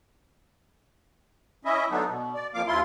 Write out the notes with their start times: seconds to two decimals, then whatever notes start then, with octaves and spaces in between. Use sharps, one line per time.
1.65 C#4 E4 D#5 E5
1.90 D3 F#3 A3 B3 D4 D#4
2.09 B2
2.34 D5
2.54 F2 F3 A#3 F5 D6
2.67 D#2 E4 F4 C6